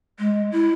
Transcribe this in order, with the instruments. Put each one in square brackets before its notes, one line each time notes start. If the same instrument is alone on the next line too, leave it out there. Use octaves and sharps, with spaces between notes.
[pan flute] G#3
E4